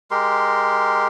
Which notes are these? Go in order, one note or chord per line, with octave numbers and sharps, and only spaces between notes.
G#3 G4 A#4 C6